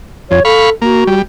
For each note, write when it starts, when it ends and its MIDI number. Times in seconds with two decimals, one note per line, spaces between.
0.31 0.40 41
0.31 0.41 73
0.45 0.71 69
0.45 0.70 77
0.45 0.70 83
0.45 0.70 85
0.82 1.04 58
0.82 1.18 66
1.07 1.22 55